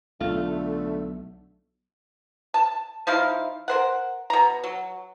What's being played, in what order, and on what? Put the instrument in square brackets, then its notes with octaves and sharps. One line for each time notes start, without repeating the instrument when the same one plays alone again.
[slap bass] B1 [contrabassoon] D3 [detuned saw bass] A3 [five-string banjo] F4
[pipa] A5
F3 D#4 E4 F5
A#4 C5 F#5
B2 A#5
F#3